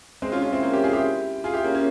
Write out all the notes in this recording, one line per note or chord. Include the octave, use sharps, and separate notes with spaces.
G#3 C4
C#4 F4
C#4 F4
C4 E4
A#3 C#4
E4 G4
F4 G#4
E4 G4
F4 G#4
E4 G4
A#3 C#4
A#3 C#4